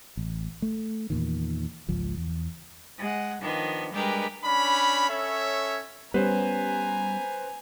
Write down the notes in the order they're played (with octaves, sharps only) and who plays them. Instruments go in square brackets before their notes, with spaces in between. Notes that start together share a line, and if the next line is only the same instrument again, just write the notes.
[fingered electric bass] A1
A3
E2 A#2 D#3
G#1 C#2 G#2 F3
E2
[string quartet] G#3 F#5
D#3 F3 B3 D4
G3 G#3 D4 G4 A#4 B4
[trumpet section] C#4 D4 B5
C#4 A4 C#5 E5
[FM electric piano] G3 [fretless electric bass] B3 C#4 [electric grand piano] B4 C5 [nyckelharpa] G#5 A#5